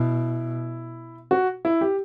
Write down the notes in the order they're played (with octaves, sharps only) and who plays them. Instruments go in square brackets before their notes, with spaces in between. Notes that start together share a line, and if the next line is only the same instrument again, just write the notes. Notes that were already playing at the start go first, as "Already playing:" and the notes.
Already playing: [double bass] B2 [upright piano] E4
[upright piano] F#4
E4
G4